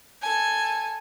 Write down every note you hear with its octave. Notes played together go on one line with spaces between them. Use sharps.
A4 G#5